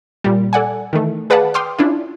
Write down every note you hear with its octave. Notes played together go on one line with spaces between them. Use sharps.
A#2 G3
A4 D5 F#5 G#5
D#3 E3 A3
G#4 B4 D5 F5 F#5 A5
G5 C6 D6 D#6 F6
C#4 D4 E4 F4